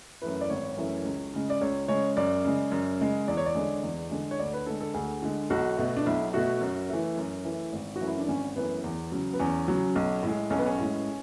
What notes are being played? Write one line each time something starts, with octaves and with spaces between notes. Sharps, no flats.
F#2 E3 A3 B4
D5
G#1 C#5
F#2 E3 A3
C#2
C#3 G#3
D5
C#2 C#5
C#3 G#3 C#5
F#2 D5
C#3 G#3
F#2
C#3 G#3
E2 D5
C#5
D5
D3 G#3
E2
D3 G#3
C#5
D2 D5
B4
D3 G#3 A4
A4
D2 G#4
D3 G#3
B1 F#4
B2 A3
D4
B1 E4
B2 A3 F#4
F#2
E3 A3
F#2
E3 A3
G#1
F#4
F#2 E3 A3
E4
D4
G#1 C#4
F#2 E3 A3 B3
E2
C#3 F#3
B3
E2 C#4
C#3 F#3
B1
A2 G#3
B1 C#4
B3
C#4
A2 G#3